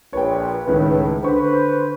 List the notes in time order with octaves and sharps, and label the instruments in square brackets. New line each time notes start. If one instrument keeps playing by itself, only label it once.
[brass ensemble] A#1 [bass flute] B4 [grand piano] C#5 G5
[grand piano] C#2 D#3 C#4 [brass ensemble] A2
[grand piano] D3 C#6 [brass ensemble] B4 [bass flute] C5